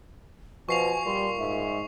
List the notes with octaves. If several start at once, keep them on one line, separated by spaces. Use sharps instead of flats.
B2 F3 G#5 C#6 C7 F7
A#2 G3 C6
G#2 E5